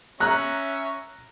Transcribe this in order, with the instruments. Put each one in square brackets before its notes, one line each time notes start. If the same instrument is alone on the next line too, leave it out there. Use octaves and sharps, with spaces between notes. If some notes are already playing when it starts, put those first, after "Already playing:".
[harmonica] C#4 E5 C#6 [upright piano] A#5 F#6